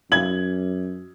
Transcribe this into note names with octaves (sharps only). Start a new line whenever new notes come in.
F#2 G#6 F#7